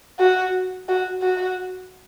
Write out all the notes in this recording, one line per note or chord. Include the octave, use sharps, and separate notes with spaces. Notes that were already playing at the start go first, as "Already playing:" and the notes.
F#4
F#4
F#4